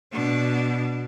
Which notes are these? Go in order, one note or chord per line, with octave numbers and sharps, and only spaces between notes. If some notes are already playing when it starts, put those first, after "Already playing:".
B2 D4